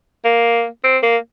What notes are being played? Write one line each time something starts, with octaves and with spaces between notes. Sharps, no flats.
A#3
C4
A#3